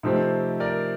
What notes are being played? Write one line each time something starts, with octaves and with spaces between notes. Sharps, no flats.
C3 F3 A3 C4 D#4 G4
A#4 D5